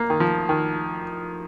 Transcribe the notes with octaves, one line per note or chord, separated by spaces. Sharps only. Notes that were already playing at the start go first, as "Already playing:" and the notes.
Already playing: A#3
D#3
F3
D#3